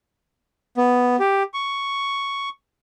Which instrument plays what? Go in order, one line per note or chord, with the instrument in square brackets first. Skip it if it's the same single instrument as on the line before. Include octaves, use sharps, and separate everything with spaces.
[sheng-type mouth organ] B3
G4
C#6